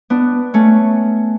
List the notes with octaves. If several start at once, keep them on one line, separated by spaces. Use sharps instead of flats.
B3 D4
A3 C#4